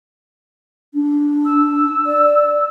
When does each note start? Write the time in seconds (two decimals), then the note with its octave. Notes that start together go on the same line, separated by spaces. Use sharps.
0.94 D4
1.45 E6
2.06 D5